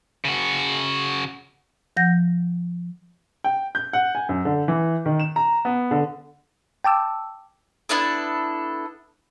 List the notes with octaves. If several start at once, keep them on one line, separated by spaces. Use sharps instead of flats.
C#3 F#4
F3 F#5 G6 A#6
G5
G6
F#5
G#5
F#2
D3
E3
D#3
E7
A#5
B3
D3
G5 A5 D6 E6
B3 D4 E4 A4